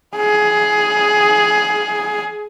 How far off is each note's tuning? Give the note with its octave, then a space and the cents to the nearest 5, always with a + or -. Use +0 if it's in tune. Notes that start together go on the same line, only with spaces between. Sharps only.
G#4 +15